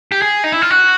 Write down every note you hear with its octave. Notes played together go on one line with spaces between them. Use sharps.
G4
G#4
D#4
E4
F4
F#4